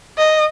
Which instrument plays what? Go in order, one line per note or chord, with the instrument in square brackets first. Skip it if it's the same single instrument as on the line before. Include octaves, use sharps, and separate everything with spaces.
[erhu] D#5